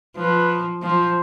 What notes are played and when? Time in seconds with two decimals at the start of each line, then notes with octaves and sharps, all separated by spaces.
0.17 F3 B4
0.82 F3 C5